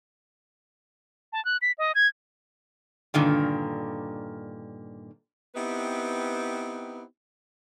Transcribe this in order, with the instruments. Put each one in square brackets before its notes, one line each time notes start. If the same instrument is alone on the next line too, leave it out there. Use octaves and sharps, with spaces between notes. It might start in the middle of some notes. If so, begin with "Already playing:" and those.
[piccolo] A5
F#6
B6
D#5
G#6
[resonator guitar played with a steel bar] G2 A#2 D3 D#3
[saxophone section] B3 C4 D#4 E4 G4 B4